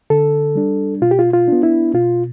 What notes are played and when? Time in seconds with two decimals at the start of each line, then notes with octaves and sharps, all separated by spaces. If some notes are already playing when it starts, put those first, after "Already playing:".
0.10 D3 A4
0.55 G3 D4
1.02 B2 F4
1.11 G4
1.19 F4
1.33 F4
1.48 B3 D4
1.63 E4
1.94 B2 F4